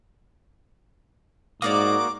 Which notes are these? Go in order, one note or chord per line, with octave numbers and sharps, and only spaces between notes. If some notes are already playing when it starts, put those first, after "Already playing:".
G#2 A#3 F#4 A#4 D5 D6 D#6